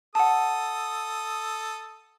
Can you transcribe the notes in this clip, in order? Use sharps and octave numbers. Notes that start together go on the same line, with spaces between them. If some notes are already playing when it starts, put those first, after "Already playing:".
A4 F#5 A5 D#6